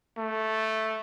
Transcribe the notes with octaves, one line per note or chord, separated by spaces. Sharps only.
A3